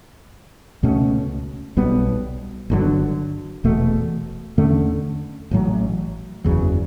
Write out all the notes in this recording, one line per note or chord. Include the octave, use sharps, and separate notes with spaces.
C#2 B2 A3 C#4
B1 B2 G3 B3
G1 G2 D3 F#3
E1 E2 B2 A3
E2 D3 A3 C#4
A1 A2 F#3
F#1 E2 C#3 F#3